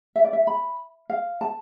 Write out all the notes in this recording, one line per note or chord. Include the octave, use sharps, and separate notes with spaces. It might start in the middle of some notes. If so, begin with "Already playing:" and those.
E5
D5
E5
B5
F5
A5